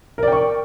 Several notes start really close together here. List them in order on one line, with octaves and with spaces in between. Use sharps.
A#4 D5 G5 C#6